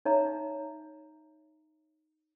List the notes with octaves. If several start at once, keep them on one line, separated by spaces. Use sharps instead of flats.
D#4 C#5 E5 A#5